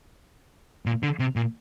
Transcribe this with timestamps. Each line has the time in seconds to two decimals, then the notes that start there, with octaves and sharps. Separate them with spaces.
0.86 A#2
1.03 D3
1.19 C3
1.36 A#2